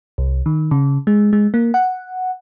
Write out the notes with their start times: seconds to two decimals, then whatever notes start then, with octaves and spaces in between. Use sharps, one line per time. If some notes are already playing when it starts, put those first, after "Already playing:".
0.18 C2
0.46 D#3
0.71 C#3
1.07 G#3
1.33 G#3
1.54 A#3
1.74 F#5